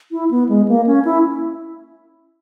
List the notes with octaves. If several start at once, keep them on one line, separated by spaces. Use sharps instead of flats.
E4
B3
G#3
A#3
C#4
E4